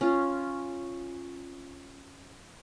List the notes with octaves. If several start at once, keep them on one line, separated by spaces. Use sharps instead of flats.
C#4 F4